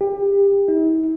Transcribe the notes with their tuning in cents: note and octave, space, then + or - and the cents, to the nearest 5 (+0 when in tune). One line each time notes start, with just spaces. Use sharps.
G4 +25
E4 -45